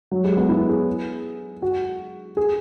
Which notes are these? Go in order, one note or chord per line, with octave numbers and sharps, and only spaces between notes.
F#3
G#3
B3
E4
G#4
F#4
G#4